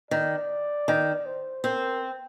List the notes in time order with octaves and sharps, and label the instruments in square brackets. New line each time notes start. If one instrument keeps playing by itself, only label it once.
[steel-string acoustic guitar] D#3 [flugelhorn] D5
[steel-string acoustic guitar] D#3
[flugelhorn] C5
[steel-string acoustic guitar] C4 [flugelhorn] A#4